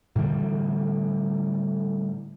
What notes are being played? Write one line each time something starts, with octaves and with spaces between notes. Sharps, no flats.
A2 D3 E3 G3